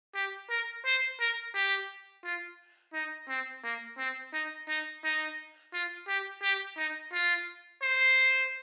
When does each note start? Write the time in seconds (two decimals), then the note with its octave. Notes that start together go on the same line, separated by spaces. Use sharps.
0.15 G4
0.50 A#4
0.86 C5
1.20 A#4
1.54 G4
2.24 F4
2.94 D#4
3.29 C4
3.64 A#3
3.98 C4
4.33 D#4
4.69 D#4
5.04 D#4
5.73 F4
6.08 G4
6.43 G4
6.77 D#4
7.13 F4
7.82 C5